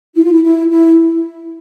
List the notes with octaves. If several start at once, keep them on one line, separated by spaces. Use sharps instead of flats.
E4
F4
E4
E4
E4